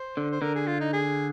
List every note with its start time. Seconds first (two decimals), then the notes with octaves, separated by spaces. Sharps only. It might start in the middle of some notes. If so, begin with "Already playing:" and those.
Already playing: C5
0.17 D3
0.31 C5
0.42 D3 A#4
0.55 G#4
0.67 F4
0.80 D#4
0.93 G#4